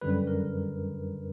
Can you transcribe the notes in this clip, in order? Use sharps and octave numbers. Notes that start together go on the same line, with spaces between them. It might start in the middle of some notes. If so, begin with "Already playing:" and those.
F#2 D3 G3 B4
A#4